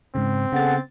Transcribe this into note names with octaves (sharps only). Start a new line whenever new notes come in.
G#2 C#3 C4
C#3 B3 G#4 A4 F#5 A6